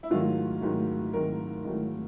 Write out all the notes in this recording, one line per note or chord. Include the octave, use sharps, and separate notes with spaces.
E4
G#2 D#3 F#3 A3 F4
G#2 D#3 F#3 A3
G#2 D#3 F#3 A3 A#4
G#2 D#3 F#3 A3